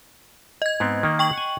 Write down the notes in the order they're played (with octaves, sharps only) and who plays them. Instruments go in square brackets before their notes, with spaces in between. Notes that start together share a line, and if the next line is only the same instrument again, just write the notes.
[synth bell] D#5 G#6
[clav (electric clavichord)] G#2 B3 C4
D#3 A#3
[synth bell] G5 C#6 F#7
[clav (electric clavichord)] F#5 G#5